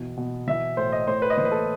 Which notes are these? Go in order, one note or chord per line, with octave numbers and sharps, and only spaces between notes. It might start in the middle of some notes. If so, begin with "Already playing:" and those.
Already playing: B2 E3
B2
E3 E5
A2 C5
D#5
A2 C5
B4
D#5
E3 C5
B4
A4